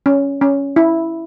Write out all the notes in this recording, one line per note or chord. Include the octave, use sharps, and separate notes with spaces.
C#4
C#4
E4